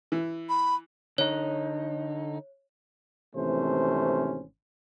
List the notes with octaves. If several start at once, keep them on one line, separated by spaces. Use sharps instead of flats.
E3
B5
D3 D#4 C#5
G#1 C3 E3 A3 C#4 C5